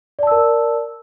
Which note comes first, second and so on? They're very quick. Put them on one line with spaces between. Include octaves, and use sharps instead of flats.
D5 A5 E6 A#4